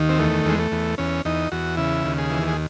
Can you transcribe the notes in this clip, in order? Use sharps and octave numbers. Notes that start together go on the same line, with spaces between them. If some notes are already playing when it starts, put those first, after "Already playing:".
Already playing: D#2 D#3
C4
E2 A3
E2 G#3
A3
E2
E2 C#4
E2 D#4
E2 F#4
C#3 E4
D#2
G#4
E3
G#4